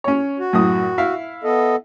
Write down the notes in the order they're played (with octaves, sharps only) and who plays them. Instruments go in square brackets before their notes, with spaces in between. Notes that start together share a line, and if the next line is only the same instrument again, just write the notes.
[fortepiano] C#4 C#5
[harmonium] F#4
[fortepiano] F#2 A2 D#6
E4 E5 F5
[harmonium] B3 A4 D#5